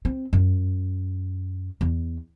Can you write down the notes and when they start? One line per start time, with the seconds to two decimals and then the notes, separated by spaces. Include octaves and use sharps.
0.05 C4
0.33 F#2
1.81 E2